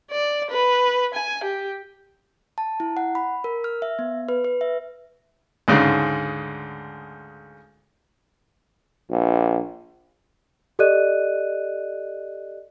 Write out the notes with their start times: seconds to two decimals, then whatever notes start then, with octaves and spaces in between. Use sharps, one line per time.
0.12 D5
0.51 B4
1.14 G#5
1.44 G4
2.58 A5
2.80 E4
2.97 F#5
3.15 B5
3.44 A#4
3.64 F6
3.82 E5
3.99 B3
4.29 B4
4.45 B4
4.61 E5
5.68 D2 G#2 C#3
9.10 A#1
10.79 G4 A4 D5 D#5 F#6 D#7